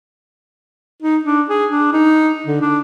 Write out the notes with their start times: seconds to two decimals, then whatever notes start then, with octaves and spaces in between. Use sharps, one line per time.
1.02 D#4
1.24 D4
1.49 G#4
1.71 D4
1.93 D#4
2.47 D3
2.61 D4